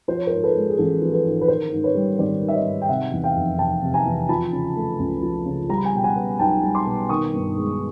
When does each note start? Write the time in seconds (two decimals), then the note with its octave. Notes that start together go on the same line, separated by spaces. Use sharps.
0.08 F3 C5
0.17 C#5
0.27 G#2 A#4 C5
0.44 A4 B4
0.55 G#3
0.69 G#4
0.78 A1 A4
1.02 F3
1.13 A4 B4
1.25 G#2
1.41 B4
1.48 D#3 A#4 C5
1.72 G#2
1.84 B4 C#5
1.95 G3
2.19 G#1 C5 D5
2.42 D#3
2.48 E5
2.53 C#5 D#5
2.66 G#2
2.81 G5
2.88 C3 E5 F#5
3.12 E2
3.24 F5 G5
3.36 F1
3.58 F1 G5 A5
3.82 C3
3.94 G#5 A#5
4.05 E2
4.29 F3 A5 B5
4.52 C#3
4.76 A3
4.99 C#2
5.23 F3
5.45 C#3
5.69 G3 A#5
5.77 B5
5.85 G#5 A#5
5.93 B2 G5
6.04 F#5 G#5
6.16 B3
6.39 B1 G5 A5
6.63 G3
6.75 C6 D6
6.86 B2
7.09 D#3 C#6 D#6
7.33 G2
7.57 G#3